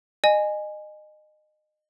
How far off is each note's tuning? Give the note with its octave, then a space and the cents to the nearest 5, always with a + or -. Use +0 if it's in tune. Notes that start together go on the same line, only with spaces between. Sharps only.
D#5 -25 G#5 +0